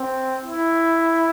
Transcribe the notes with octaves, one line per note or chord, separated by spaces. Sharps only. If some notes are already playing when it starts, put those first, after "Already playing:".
Already playing: C4
E4